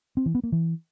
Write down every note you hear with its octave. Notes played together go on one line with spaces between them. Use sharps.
C4
E3
B3
A#3
E3